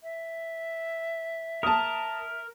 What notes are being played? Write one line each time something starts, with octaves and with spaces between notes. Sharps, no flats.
E5
A#4 A5 D#6